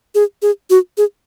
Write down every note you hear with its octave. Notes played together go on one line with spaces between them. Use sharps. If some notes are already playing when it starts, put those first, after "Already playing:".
G#4
G#4
F#4
G#4